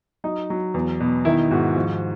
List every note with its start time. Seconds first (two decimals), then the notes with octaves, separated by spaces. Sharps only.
0.24 F#3 D#4
0.50 F#3
0.74 E2
1.00 B2
1.25 D#3 E4
1.51 G#2 F#4
1.76 F3 F#4